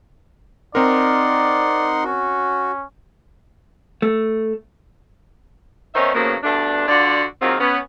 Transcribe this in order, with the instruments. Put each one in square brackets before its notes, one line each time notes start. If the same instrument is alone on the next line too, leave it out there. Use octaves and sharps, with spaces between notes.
[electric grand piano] C4 A#4 [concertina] D#4 F#5 C6 [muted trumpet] D5
[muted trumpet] C#4 [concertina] F#4
[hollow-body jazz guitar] A3
[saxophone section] D#3 B3 C#4 D#4 C5 E5
A2 C#3 F3 F#3 A#3 B3
G2 B2 A3 D4
D3 D4 F4 F#4 D5
D#3 F#3 G#3 A#3 C4 F4
B3 C#4